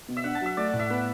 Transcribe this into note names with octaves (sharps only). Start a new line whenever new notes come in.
B2
E5
D4 F#5
A5
F#3 E5
A3 D5
F#5
A2
E5
B3 B4